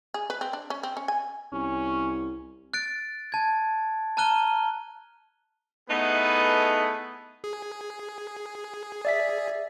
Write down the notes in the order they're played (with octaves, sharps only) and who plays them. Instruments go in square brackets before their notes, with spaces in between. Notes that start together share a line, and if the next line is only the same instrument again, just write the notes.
[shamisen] G#4
B4
C4
D4
C#4
C4
C#4
G#5
[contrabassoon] C2 [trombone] C#4
[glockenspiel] F#6 A6 D7
A5 G#6
A5 A#5 F6 F#6 D#7 G7
[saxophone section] A3 B3 [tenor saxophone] D#4 [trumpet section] E4 G#4 B4
[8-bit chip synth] G#4
[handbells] D5 E5 B6